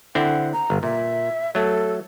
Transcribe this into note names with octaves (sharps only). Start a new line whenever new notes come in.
D3 C4 E4 F#5
A#5
G1
A#2 E5
F#3 A3 A4